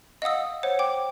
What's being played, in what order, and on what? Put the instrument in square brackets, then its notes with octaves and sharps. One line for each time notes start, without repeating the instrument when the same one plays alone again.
[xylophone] D#5 F5 F#5 D#6 E6
C5 C#5 F#5
G5 D6